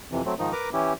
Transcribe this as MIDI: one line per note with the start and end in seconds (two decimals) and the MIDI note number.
0.12 0.22 41
0.12 0.22 48
0.12 0.22 52
0.25 0.34 54
0.25 0.34 57
0.25 0.34 60
0.39 0.52 44
0.39 0.52 51
0.39 0.52 53
0.39 0.52 63
0.52 0.70 70
0.52 0.70 71
0.52 0.70 82
0.52 0.70 86
0.73 0.93 52
0.73 0.93 61
0.73 0.93 64
0.73 0.93 67